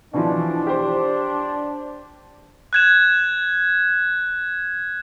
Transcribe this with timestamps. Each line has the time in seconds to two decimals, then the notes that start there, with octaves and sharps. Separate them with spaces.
0.13 B2 E3 F3 D4
0.67 G4 C5
2.73 F#6 G#6 E7